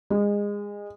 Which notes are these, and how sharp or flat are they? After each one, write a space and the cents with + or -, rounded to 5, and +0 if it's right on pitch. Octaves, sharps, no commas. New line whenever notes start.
G#3 -25